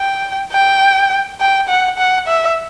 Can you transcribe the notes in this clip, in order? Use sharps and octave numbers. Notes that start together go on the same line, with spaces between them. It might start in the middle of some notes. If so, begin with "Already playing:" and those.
Already playing: G5
G5
G5
F#5
F#5
E5